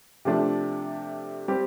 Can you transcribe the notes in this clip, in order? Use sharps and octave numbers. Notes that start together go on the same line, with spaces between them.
C3 F3 A3 D4
G3 C4 G4